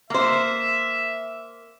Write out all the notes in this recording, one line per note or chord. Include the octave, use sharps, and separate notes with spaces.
A#3 C5 E5